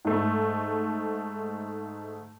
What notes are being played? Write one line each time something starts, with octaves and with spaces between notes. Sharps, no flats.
G#2 A3